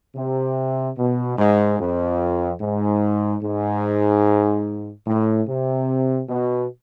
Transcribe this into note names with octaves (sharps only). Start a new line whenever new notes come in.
C3
B2
G#2
F2
G#2
G#2
A2
C3
B2